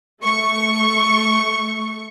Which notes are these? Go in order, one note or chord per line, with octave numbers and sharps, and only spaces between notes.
A3 C#6